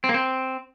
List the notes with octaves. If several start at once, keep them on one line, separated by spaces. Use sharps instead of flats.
C4
A#3
C4